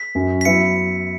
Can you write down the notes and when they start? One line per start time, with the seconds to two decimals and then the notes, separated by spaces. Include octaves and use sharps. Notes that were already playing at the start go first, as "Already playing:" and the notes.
Already playing: B6
0.15 F#2 F#3 C#4
0.41 B6
0.45 F#3 B3 E4 B4 E5 C#7